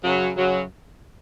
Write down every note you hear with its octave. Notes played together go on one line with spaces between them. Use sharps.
F#2 C#3 F#3
F#2 C#3 F#3